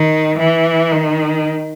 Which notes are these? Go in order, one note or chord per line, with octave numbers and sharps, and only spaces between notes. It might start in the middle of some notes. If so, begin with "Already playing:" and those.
Already playing: D#3
E3
D#3